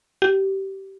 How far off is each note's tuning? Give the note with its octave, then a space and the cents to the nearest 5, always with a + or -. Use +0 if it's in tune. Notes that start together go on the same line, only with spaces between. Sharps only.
G4 -20